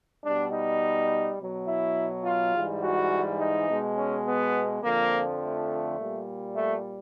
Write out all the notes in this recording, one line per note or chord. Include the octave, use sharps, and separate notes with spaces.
B2 G3 D4
D#4
B2 F#3
E4
F4
G#2 E3 G3
F#4
D#4
B2 G#3
C#4
B3
F2 D3 F3 A#3
A3
A#2 G3
A3